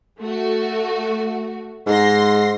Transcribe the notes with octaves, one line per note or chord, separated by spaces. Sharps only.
A3 F#4
G#2 C6 A#6